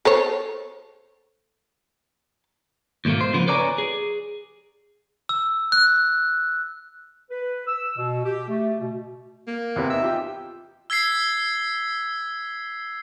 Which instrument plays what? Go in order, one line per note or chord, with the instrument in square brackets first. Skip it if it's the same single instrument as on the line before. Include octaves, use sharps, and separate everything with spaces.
[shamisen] A4 C5 C#5
[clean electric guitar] D#2 G#2 B2 A3 A#3
C5
C#3 F3 A#3 B3
A4 B4 C#5 D5 G#5 A#5
G#4
[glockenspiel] E6
F#6
[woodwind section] B4
E6
B2
G4
A3
B2
[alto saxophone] A#3
[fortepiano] E2 C3 B4
[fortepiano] D#4 [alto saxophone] E5
[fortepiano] F4 G4 G5
[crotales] E6 G#6 B6 C7